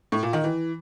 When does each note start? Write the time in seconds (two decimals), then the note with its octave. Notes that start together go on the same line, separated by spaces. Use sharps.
0.12 A2
0.23 A#2
0.33 D#3
0.44 E3